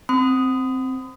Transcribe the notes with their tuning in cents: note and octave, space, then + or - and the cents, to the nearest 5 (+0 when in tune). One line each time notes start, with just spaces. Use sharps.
C4 +0 B5 +45 D#6 +0